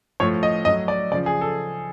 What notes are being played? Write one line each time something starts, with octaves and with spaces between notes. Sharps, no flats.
A2 F3 C#5
D#5
A2 F#3 D#5
D5
C#3 F3 D5
G#4
A4